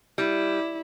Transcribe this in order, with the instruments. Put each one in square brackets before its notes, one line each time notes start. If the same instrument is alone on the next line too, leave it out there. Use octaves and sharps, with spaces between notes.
[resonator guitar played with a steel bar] G3 [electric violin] E4